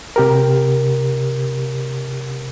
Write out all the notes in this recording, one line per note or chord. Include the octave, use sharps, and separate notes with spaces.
C3 G4 A#4